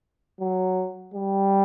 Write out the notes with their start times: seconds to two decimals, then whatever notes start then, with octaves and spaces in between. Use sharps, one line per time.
0.40 F#3
1.14 G3